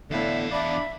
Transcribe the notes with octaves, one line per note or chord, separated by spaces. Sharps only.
E2 A2 D3 B3 E5 F5
D4 E5 B5